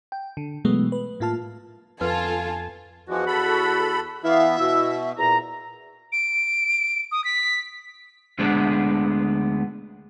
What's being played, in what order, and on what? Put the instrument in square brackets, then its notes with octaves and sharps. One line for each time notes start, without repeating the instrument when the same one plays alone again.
[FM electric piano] G5
D3
B2 E3 F#3 G#3 A3 B3
B4
A2 A#3 F4 A5 F6
[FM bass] F2 [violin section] F4 A4 [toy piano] B4 [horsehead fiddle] G#5 A5
[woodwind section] E2 F#4 [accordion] E3 F3 G#3
[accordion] A4 B5
[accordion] E3 B3 [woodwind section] E4 F5 [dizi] E5
[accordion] B2 [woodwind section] E4 F#4 E6
[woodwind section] E2 A#2 A#5
[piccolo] D7
D#6
B6
[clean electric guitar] D2 D3 G#3 B3 D4